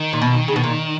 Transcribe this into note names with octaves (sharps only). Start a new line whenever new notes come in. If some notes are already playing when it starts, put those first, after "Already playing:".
Already playing: D#3
A#2
B2
C#3
B2
A#2